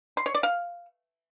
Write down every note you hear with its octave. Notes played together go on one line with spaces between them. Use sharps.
C6
C#5
D5
F5